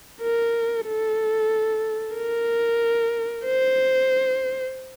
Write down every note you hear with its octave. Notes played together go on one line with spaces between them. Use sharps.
A#4
A4
A#4
C5